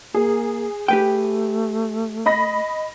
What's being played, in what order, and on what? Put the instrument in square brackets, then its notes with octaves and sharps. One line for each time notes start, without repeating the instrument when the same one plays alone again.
[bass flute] A#3 [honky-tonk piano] G#4
[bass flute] A3 [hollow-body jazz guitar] G4 B4 G5
[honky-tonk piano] D#5 B5 A#6